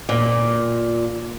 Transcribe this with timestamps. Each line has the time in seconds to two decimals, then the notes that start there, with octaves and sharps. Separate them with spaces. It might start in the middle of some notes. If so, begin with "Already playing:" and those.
0.09 A#2